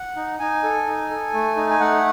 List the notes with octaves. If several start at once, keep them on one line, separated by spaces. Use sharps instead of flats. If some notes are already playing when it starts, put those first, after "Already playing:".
Already playing: F#5
D#4
D#4 G#5
A4
D#4
A4
A3
D#4
G#5
A3 F#5